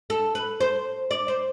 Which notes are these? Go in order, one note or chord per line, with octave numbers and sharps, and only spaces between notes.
A4
B4
C5
D5
C5